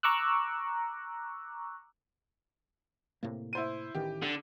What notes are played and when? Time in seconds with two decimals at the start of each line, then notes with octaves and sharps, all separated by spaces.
0.03 A#5 C#6 D6 E6 F#6
3.23 A2 C3 A#3
3.53 E4 C5 D#7
3.95 A1 D#3 E3 G4
4.23 D3